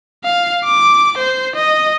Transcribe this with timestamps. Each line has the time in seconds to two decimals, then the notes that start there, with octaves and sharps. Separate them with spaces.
0.24 F5
0.65 D6
1.17 C5
1.55 D#5